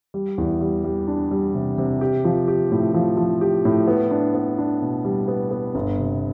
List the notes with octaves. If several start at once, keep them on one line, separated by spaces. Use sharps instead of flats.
G3
E2
G3
G3
D4
G3
C3
C3
G4
F3
G4
A2
F3
F3
G4
A2
B3
D4
B3
D4
B2
G3
B3
B3
G1
C3